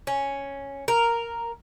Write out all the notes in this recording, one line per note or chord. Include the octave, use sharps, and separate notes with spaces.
C#4
A#4